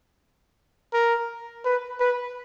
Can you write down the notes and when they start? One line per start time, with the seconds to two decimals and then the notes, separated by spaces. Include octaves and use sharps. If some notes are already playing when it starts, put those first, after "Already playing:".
0.93 A#4
1.65 B4
2.00 B4